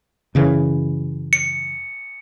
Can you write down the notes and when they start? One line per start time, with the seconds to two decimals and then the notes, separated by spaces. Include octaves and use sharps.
0.35 F#2 C#3 E3
1.33 C#7